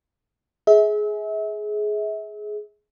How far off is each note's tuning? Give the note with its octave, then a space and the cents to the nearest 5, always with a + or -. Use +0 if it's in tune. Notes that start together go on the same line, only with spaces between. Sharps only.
G#4 +15 E5 -35